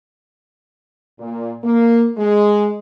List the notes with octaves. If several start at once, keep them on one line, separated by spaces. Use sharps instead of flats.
A#2
A#3
G#3